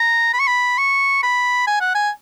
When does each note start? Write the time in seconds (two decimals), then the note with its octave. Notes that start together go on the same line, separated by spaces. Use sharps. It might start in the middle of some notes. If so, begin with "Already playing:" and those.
Already playing: A#5
0.34 B5
0.40 C#6
0.47 B5
0.78 C#6
1.23 B5
1.67 G#5
1.80 F#5
1.94 G#5